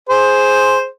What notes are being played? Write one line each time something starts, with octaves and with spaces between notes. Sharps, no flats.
G#4 C5